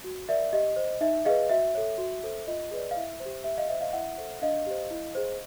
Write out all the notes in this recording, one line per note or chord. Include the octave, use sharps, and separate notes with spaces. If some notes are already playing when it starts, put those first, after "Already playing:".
F#4
A#4 D5 E5
G4 D#5
C5
D#4 E5
G#4 B4 D#5 F5
F#4 E5
A4 C#5
F#4
A4 C5
F4 D#5
G#4 B4 D5
F5
E4 E5
C5
G4
G4 E5
D#5 F5
C5 E5
D#5 F5
E4 E5 F#5
A4 C5
D4 D#5 F5
G4 C5
E4
G#4 C5